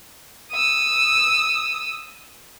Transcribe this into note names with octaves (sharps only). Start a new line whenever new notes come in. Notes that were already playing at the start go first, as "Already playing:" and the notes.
D#6 E6